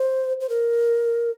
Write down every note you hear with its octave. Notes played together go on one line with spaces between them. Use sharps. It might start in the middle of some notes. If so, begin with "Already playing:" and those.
Already playing: C5
C5
A#4